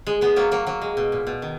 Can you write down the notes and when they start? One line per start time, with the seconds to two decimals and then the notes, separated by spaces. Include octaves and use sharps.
0.07 G#3
0.21 G#3 B3
0.36 F#3 A#3
0.51 F#3 A#3
0.67 F#3 A#3
0.82 G#3
0.97 B2
1.12 A#2
1.27 B2
1.42 D#3